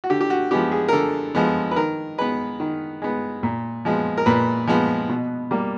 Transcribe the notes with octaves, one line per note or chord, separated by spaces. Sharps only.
F#4
D3 G4
G4
F#4
F3 G#3 B3 G4
G#4
A#4
D3 A4
F3 G#3 B3
B4
D#3 A#4
G#3 B3 B4
D#3
G#3 B3
A#2
F3 G#3 B3
A#4
A#2 B4
F3 G#3 B3
B2
G3 A#3